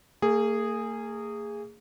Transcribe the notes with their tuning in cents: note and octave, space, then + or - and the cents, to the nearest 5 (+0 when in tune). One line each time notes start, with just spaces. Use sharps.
A#3 -45 G#4 -10